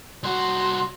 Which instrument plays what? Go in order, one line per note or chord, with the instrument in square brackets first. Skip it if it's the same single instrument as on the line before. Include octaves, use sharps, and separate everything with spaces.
[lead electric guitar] C2 F#4 [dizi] C6